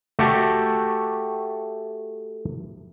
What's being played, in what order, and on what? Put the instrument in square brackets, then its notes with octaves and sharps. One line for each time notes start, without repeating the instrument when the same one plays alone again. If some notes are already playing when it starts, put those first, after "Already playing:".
[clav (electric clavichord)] A3 F#4 G4 A4